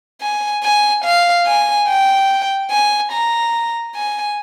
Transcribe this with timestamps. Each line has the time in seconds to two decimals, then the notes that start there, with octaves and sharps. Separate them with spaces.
0.22 G#5
0.63 G#5
1.04 F5
1.46 G#5
1.88 G5
2.71 G#5
3.12 A#5
3.96 G#5